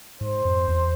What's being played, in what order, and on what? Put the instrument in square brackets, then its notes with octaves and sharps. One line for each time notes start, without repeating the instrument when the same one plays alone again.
[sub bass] G#2 [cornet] C5
[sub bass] F2
E2